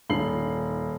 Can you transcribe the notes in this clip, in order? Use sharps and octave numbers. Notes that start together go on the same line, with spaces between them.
D#1 C7 F#7